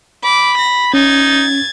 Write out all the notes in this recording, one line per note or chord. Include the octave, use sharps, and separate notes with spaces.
B5 D6
A#6
C#4 D#4 G#6 A6